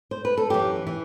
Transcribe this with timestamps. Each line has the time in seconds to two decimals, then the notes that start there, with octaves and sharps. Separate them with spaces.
0.11 C5
0.25 B4
0.37 A4
0.50 F#2 E3 G4
0.87 E3